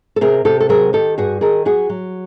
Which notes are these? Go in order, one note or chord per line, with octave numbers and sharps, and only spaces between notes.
A4
C3 G#4 A#4
C3 G4 A4
A4
F#3 G#4 A#4
D#3 G4 A4
G2 F#4 G#4
D#3 G#4 A#4
F#3 F#4 G#4
F#3